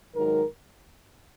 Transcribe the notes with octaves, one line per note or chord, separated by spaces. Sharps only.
G#2 D#3 F#3 A#4